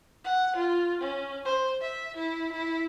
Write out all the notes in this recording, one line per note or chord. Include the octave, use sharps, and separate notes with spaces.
F#5
F4
C#4
C5
E5
E4
E4